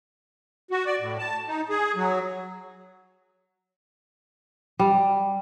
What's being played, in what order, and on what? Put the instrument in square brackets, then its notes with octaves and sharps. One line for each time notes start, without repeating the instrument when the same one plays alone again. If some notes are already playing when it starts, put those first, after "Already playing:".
[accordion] F#4
D5
A2
A5
D#4
G#4
F#3
[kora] G3